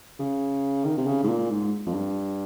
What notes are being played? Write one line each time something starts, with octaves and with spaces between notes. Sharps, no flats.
C#3
D#3
C3
C#3
G#2
A#2
G#2
F2
G2